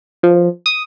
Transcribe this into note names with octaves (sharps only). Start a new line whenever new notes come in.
F3
D#6